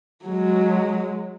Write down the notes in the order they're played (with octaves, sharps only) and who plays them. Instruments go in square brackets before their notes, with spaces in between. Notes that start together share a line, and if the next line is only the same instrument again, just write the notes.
[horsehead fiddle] F#3 G#3